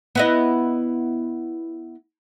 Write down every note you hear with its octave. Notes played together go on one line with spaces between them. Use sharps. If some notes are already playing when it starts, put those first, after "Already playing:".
B3 E4 D#5